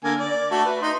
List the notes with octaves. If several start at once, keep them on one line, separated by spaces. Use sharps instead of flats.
D3 A#3 G#5
D5
A3 F#4
B4
D#4 C6